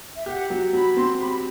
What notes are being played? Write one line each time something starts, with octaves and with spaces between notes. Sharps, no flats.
E5
G4 F#5
F#3
F#3 B5
C4 C6
G4 B5